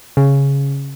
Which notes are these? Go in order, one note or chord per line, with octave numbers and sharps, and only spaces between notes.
C#3